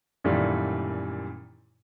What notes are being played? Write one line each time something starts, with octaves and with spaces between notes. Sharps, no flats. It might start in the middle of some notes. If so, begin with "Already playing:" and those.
F#2 A#2 D#3 E3 G3 A3